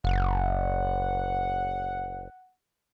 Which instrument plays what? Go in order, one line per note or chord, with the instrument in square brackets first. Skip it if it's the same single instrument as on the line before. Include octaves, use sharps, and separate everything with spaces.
[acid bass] F#1 [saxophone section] F#5